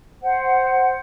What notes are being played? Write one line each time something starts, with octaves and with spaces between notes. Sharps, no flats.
C5 F#5